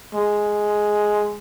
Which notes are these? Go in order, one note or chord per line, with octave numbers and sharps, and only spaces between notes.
G#3